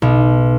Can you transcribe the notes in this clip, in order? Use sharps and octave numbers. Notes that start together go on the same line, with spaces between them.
B1